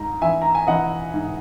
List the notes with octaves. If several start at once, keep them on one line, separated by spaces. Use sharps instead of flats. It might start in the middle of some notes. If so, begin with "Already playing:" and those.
Already playing: G#2 A#5
E3 E5 G#5
A#5
G#5
E3 D#5 F#5
G#2